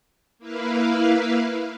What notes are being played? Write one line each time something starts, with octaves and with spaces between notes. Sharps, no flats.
A#3 E4 B4 F5